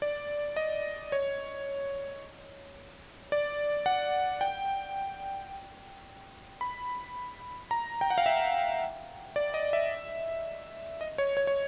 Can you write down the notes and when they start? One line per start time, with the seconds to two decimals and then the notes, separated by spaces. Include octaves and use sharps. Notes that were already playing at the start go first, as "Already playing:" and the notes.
0.02 D5
0.56 D#5
1.12 C#5
3.32 D5
3.86 F#5
4.41 G5
6.61 B5
7.71 A#5
8.01 G5
8.10 F#5
8.18 F5
8.26 E5
9.36 D5
9.54 D#5
9.73 E5
11.01 D#5
11.18 C#5
11.37 C#5
11.47 C#5